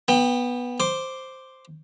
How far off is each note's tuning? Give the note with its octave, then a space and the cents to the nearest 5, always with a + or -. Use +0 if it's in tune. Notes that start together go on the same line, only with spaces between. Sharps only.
B3 -10 G5 +20
C5 +0 D6 +0